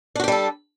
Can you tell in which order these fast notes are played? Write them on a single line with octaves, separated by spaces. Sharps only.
D4 F#4 G4 G3 A4